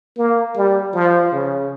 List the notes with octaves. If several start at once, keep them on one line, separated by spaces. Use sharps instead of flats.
A#3
G3
F3
C#3